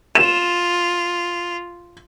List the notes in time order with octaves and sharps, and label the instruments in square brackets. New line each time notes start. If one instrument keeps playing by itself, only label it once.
[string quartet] F4 [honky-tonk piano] E7